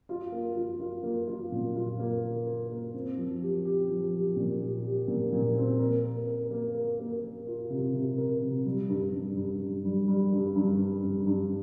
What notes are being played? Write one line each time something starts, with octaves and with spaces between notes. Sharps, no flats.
F4
A#3
F4
F4
A#3
F4
A#2
F4
A#3
A#4
A#4
A#3
C4
F3
G4
G4
F3
G4
A#2
G4
G4
A#2
A#2
C4
A#4
A#4
A#4
A#3
A#4
A#3
A#3
F4
C3
C3
A#4
C3
G3
G2
G2
G2
G2
G3
G3
G2
G2
G2
G2
G2